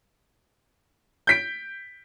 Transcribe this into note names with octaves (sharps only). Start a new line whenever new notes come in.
G6 B6 D7